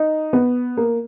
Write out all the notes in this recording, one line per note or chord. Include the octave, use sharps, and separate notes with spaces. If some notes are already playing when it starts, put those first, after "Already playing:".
Already playing: D#4
B3
A#3